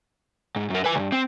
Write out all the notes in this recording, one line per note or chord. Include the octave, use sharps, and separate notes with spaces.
G#2
F#2 A#4
B4 G#5
C2 G2
C4